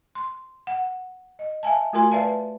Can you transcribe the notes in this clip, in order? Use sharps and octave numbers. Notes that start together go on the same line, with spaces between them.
C6
F#5
D#5
E5 F5 G#5 A5
A3 F4 F#4 A#4 G#5 C6
B4 D5 E5 F5 A5